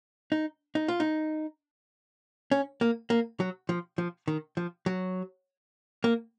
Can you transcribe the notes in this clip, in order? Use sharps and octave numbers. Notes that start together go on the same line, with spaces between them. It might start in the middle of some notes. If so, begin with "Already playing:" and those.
D#4
D#4
F4
D#4
C#4
A#3
A#3
F#3
F3
F3
D#3
F3
F#3
A#3